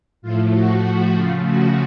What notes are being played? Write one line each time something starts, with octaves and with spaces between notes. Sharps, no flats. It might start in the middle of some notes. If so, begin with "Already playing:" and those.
A2 F3 A3 F4
F#4
C#3 F3 A3 F4
F#4